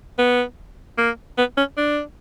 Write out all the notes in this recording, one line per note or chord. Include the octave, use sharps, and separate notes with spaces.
B3
A#3
B3
C#4
D4